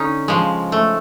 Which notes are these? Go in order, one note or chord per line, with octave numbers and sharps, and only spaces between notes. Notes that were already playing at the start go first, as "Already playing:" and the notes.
Already playing: D3 C#4 D#4
C#3 F3 G#3
A3